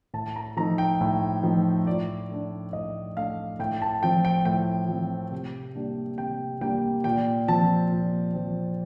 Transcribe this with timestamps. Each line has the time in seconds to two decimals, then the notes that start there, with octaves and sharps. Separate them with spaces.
0.14 A2 A5
0.36 A#5
0.57 F3 A3 D#4 A#5
0.78 G5
1.01 A2
1.43 F3 A3 D#4
1.87 A2 D5
2.31 A3 D4
2.73 A2 D#5
3.17 A3 D4 F5
3.59 A2 G5
3.82 A5
4.03 F3 C4 G5
4.25 G5
4.45 A2 G5
4.89 F3 C4
5.32 C3
5.75 G3 A#3 D4
6.18 C3 G5
6.61 G3 A#3 D4 G5
7.04 A#2 G5
7.48 F3 C4 A5
7.91 A#2
8.34 F3 C4